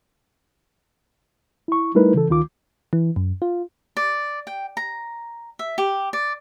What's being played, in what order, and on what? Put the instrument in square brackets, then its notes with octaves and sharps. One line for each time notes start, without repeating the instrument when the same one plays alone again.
[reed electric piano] E4 C#6
G3 A3 D#4 E4 A#4 B4
C#3 E3 A4
D2 D#3 F4 D6
[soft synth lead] E3
F#2
F4
[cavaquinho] D5
G5
A#5
E5
G4
D5